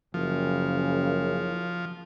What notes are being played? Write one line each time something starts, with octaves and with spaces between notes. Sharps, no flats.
F#1 C#3 F3